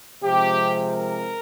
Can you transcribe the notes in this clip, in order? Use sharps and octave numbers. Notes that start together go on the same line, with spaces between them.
C3 F3 G#3 C4 G4
A#4